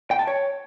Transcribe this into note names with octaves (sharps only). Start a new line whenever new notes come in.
G5
A5
C#5